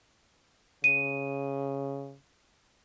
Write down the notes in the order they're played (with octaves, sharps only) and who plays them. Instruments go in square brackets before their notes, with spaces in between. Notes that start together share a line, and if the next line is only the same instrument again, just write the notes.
[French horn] C#3 [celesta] D#7